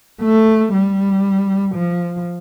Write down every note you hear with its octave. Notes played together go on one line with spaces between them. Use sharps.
A3
G3
F3